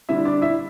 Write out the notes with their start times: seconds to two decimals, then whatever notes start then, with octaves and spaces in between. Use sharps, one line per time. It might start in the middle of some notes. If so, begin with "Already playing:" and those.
0.09 D3 G3 D4 E4 E5
0.25 D4 D5
0.42 E4 E5